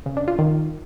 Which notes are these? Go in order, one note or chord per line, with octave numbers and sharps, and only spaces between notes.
C#3
D4
F4
D#3